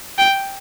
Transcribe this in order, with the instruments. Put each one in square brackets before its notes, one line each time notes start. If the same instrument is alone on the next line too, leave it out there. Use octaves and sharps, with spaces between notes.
[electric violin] G5